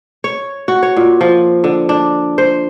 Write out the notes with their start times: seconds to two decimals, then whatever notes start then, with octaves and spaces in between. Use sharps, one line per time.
0.24 C#5
0.68 F#4
0.83 C#5
0.97 A#2
1.21 F3
1.64 D3
1.89 D4
2.38 C5